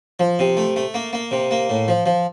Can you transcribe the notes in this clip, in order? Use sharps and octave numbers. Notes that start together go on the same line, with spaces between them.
F3
C3
A3
A3
A#3
A#3
C3
A#3
A2
F3
F3